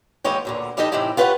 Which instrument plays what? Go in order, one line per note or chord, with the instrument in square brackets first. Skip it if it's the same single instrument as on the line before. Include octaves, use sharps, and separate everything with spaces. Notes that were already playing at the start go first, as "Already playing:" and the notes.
[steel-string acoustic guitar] D#2 E3 G#3 B4 C#5 G5
D2 A#2 D3
E3 G3 D#4 G4 A4 D#5
A2 C3 E3 D#4 E4 G4
F4 G4 B4 C#5 E5 F#5